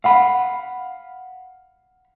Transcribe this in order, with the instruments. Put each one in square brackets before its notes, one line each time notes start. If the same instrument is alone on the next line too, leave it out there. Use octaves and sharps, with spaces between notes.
[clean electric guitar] F5 F#5 B5